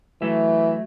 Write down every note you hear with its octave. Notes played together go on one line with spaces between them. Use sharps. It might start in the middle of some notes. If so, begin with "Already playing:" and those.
E3 F#3 A3 E5